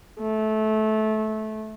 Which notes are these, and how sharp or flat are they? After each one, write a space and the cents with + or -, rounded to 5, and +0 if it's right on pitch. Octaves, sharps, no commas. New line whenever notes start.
A3 -20